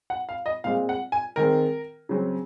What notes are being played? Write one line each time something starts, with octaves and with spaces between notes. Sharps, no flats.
F#5
F5
D#5
A#2 G#3 C4 F5
F#5
G#5
D#3 G#3 C4 A#4
C#3 F#3 C4